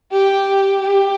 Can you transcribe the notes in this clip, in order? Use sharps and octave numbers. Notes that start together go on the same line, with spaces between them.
G4
G4